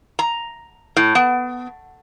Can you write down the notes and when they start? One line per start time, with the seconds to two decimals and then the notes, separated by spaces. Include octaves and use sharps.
0.19 A#5
0.97 A2
1.15 B3